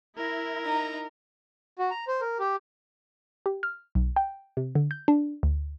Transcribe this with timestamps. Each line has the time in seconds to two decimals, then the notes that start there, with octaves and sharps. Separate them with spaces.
0.18 E4 A#4 A#6
0.65 D#4 A#5
1.79 F#4
1.91 A#5
2.08 C5
2.21 A#4
2.39 G4
3.46 G4
3.63 F6
3.95 B1
4.16 G5
4.57 C3
4.75 D3
4.91 G6
5.08 D4
5.43 D2